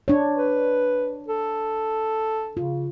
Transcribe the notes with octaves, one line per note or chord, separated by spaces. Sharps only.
D4 C#5
B4
A4
C#3 F4